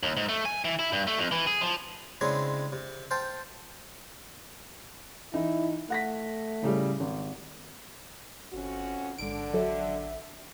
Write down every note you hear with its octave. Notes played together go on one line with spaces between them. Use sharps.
D#2
G#2
A3
G#5
E3
E4
G2
A3
F2
E3
G#4
F3
C#3 G#3 C4 D4 E4 C#5
C3
C5 F5 G5 A5
E3 D#4 E4
A3 F#5 A#6 B6
A2 C#3 G3
G#1
G1 F2 C#4 F#4
A1 G#2 D3 D4 D7
F#3 A4 E5